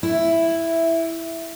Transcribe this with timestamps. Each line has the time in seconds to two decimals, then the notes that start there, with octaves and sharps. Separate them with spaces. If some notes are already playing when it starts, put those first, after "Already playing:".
0.03 E4